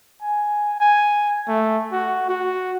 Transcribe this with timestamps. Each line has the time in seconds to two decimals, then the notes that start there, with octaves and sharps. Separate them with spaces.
0.22 G#5
0.80 G#5
1.48 A3
1.92 F#4
2.29 F#4